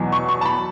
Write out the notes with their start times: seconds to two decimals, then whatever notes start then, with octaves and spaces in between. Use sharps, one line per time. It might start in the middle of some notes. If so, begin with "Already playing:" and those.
Already playing: E2 B2 F#3
0.12 C#6
0.29 C#6
0.41 A5
0.45 B5